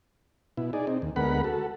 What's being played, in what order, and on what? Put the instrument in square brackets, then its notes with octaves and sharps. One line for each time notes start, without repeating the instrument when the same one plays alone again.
[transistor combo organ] B2 E4
D#4 G#4 D5
C4 D#4
D#2
D2 G#3 B3 A#4 F#5 B5
F#4 A4